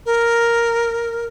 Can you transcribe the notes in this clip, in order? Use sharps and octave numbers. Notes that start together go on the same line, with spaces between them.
A#4